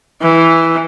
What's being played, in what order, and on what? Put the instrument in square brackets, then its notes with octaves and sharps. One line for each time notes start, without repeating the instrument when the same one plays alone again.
[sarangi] E3